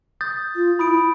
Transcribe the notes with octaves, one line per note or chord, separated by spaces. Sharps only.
D#6 G6 A6
F4
E4 B5 D#6 D7
E4